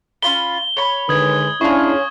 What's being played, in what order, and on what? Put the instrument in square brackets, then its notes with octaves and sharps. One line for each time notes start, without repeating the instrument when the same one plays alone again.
[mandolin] C#4 F4 B5 [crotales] G7
[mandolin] C#5 B5
[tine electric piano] D3 [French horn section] D#3 G#3 B4 [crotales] D#6 G#6
[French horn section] C#4 [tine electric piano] D4 E4 [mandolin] F4 G#4 [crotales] C#6